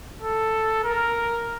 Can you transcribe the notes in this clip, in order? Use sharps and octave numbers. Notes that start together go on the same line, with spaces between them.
A4
A#4